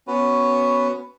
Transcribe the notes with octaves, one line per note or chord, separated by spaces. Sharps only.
B3 C#4 F#4 B4